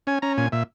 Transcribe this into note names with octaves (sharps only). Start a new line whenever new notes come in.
C#4 G#5
C#4 A#5
A#2 G#5
A#2 E5